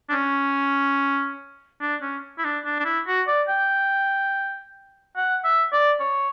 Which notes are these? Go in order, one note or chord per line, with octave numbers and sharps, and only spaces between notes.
D4
C#4
D4
C#4
E4
D4
D4
D4
E4
F#4
D5
G5
F#5
E5
D5
C#5